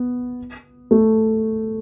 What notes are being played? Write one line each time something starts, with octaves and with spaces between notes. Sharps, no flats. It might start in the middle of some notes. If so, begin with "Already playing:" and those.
Already playing: B3
A3 A4